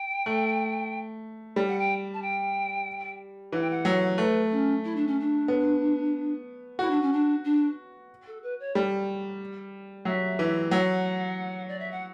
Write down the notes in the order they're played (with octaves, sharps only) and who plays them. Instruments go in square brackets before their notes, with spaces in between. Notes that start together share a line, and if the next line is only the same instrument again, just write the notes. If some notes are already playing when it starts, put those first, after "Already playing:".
Already playing: [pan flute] G5
[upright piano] A3
G3
[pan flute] F#5
G5
A5
G5
[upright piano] E3 [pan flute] F#5
[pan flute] G5
F#5
[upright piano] F#3
[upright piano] A3 [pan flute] B4
[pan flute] C#4
E4
D4
C#4
D4
[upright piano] B3
[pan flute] E4 [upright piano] F#4
[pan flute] D4
C#4
D4
D4
A4
B4
C#5
[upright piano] G3
[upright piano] F#3 [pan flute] E5
[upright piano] E3
[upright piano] F#3 [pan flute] F#5
[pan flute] D5
E5
F#5